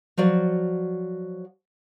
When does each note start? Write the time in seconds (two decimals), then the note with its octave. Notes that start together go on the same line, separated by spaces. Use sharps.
0.17 F3 F#3 F#4 D5